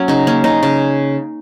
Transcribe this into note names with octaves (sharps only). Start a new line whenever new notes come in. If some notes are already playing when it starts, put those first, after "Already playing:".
Already playing: F#3 A#3 C#4
C#3 D#4
A#3 C#4
C#3 D#4
C#3